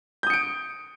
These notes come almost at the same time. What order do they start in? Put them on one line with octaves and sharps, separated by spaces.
G6 D#6 C#7 D7